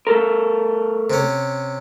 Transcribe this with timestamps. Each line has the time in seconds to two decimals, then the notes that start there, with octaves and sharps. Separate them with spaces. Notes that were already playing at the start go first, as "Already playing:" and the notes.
0.07 A3 A4 A#4
1.10 C3 C#4